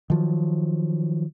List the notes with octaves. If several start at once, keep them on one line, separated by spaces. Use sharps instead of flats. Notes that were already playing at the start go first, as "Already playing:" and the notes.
D#3 F3 F#3